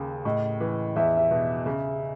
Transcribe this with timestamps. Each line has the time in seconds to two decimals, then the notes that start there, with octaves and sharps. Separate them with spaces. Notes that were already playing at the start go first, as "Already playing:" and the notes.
Already playing: D#2 C#3
0.25 A2 D#5
0.60 E3
0.96 E2 E5
1.17 E5
1.31 B2
1.66 C#3